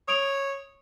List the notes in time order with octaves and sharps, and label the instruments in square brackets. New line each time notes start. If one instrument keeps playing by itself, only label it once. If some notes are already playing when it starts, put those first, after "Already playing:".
[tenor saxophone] C#5 [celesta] D#6 D7 F7